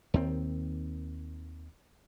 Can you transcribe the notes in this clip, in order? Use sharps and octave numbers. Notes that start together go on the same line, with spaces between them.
D#2 D#3 C4